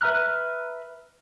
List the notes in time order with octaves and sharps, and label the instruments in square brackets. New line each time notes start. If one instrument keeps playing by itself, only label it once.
[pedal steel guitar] B4 E5 A#5 F6 F#6